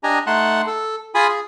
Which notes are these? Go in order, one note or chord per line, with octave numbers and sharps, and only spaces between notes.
D4 G4 D#5 G#5 A#5
A3 D#4 F#5 A5 C6 F#6
A4
F4 G#4 G#5 B5 D#6
G#4